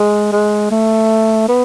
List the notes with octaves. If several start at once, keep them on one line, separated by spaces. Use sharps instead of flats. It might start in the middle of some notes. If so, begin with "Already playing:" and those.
Already playing: G#3
G#3
A3
B3